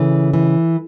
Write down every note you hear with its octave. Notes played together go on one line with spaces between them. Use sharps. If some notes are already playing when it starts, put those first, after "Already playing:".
Already playing: C#3 E3 A4
E3